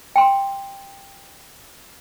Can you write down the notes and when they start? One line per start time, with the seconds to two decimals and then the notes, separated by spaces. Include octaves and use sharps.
0.16 G5 C6